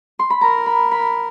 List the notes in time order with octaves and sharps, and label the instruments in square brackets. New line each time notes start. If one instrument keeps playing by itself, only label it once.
[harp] C6
B5
[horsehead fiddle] A#4 [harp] A#5
[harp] B5
B5